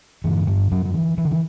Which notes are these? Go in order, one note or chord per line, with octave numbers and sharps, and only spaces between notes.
G2 D3 E3
G2 G3
F#2 F#3
F#3
E3
E3
D3
E3